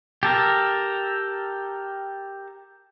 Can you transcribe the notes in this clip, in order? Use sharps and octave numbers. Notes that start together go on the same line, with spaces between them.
G4 A4 A#4